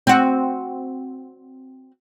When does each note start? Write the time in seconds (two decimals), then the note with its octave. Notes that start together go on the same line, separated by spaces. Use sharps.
0.07 C4 F#4